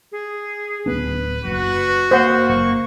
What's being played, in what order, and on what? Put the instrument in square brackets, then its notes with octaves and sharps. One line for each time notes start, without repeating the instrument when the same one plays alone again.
[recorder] G#4
[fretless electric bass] D1 B3 D4 [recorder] B4
[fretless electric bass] F#1 [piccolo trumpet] F#4
[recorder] A#3 [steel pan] C5 F#5
[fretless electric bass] F#1 [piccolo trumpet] C#6